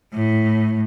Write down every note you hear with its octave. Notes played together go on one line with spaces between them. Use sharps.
A2